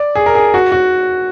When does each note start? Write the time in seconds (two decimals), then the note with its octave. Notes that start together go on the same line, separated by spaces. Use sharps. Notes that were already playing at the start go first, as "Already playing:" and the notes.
Already playing: D5
0.15 G#4
0.26 A#4
0.35 G#4
0.54 F#4
0.72 F#4